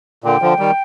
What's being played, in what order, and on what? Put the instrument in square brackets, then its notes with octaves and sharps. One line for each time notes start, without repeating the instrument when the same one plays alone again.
[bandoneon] A#2 D3 [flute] G5
[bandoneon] D3 F3
D#3 G3